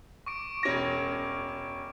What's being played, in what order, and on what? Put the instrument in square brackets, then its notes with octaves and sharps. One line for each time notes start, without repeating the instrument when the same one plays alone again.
[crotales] C#6 D6 D7
[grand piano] E1 C#4 A#6